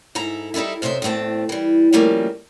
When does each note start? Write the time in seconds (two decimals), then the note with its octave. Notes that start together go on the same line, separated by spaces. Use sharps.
0.15 G#2 E4 A4 A#5
0.54 G3 D#4 E4 A4 E5
0.82 F#2 C3 C5 D#5 E5
1.02 E2 A2 A3 C4 A5
1.49 E3 G3
1.93 C#3 F3 G3 A3 A#3